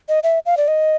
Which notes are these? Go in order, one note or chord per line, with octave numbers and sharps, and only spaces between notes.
D#5
E5
F5
D5
D#5